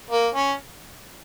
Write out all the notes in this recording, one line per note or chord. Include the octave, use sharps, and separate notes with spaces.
A#3
C#4